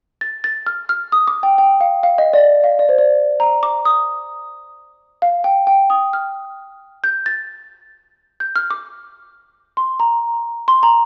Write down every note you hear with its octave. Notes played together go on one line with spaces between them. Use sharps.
A6
A6
F6
F6
D#6
D6
G5
G5
F5
F5
D#5
D5
F5
D5
C5
D5
A#5
D6
D#6
F5
G5
G5
D#6
F6
G6
A6
G6
F6
D6
C6
A#5
C6
A#5